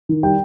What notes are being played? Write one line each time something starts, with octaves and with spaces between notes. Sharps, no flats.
D#3
G3 G5